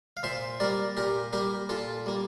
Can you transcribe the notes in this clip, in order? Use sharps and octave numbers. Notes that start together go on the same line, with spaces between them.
F5
A#2 C5 E5
G3 A#3 A#4 D5
A#2 G4 A#4
G3 A#3 G4 A#4
A#2 F4 A4
G3 A#3